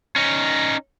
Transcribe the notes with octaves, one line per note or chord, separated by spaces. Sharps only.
C#4 D#4